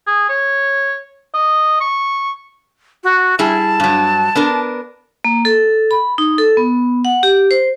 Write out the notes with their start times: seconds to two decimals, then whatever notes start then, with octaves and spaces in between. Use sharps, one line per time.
0.07 G#4
0.29 C#5
1.34 D#5
1.80 C#6
3.04 F#4
3.39 G3 E4 G#4 A5
3.80 G2 F#3
4.35 B3 D4 A#4
5.25 A#3
5.45 A4
5.91 B5
6.18 D#4
6.38 A4
6.57 B3
7.05 F#5
7.23 G4
7.51 C5